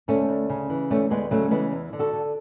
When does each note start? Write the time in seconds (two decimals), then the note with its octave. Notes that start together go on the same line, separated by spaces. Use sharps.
0.08 D2 A3 C#4
0.29 D2
0.49 C#3
0.70 E3
0.90 D2 A3 C#4
1.10 D2 G#3 B3
1.31 C#3 F#3 A3
1.51 E3 G#3 B3
1.71 E2
1.93 D3
1.99 F#4 A4
2.13 D3